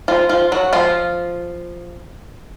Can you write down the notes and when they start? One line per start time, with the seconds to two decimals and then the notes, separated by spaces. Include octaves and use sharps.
0.08 F3 F4
0.29 F3 F4
0.52 F#3 F#4
0.73 F3 F4